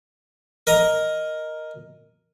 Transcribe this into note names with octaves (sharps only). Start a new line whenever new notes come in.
A#4 D#5 A#5